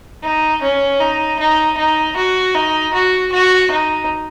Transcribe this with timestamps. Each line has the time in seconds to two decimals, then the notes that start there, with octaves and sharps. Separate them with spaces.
0.23 D#4
0.62 C#4
1.00 D#4
1.39 D#4
1.77 D#4
2.16 F#4
2.55 D#4
2.94 F#4
3.32 F#4
3.71 D#4